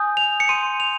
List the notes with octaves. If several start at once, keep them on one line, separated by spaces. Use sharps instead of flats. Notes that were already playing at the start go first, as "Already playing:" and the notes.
Already playing: G#5 D#6 G6
F7
C#7
C6 D#6 G6 D#7
F7